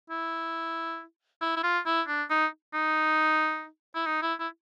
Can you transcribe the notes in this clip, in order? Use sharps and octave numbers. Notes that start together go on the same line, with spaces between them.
E4
E4
E4
F4
E4
D4
D#4
D#4
E4
D#4
E4
E4